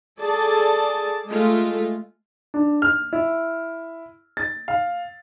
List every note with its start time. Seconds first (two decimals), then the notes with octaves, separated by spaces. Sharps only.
0.19 G#4 A4 D5 A5
1.27 G#3 A3 F4
2.54 D4
2.82 F6
3.13 E4
4.37 A6
4.68 F5